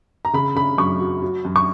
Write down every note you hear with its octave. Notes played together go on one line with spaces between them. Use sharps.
A#5
C#3 B5
C#3 B5
F#2 C#6
F#3
F#3
F#2
C#6